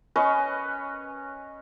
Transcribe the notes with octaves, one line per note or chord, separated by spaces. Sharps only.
C#4 B4 C#5 D#5